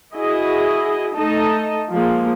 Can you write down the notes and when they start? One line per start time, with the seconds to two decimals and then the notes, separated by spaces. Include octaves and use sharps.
0.14 E4 F#4 G#4 D#5
1.16 A3 D#4 A4 D#5 A5
1.90 F3 G#3 A#3